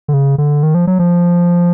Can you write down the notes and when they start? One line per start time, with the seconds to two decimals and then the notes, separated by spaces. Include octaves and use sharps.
0.08 D3
0.14 C#3
0.38 D3
0.63 D#3
0.75 F3
0.87 F#3
0.99 F3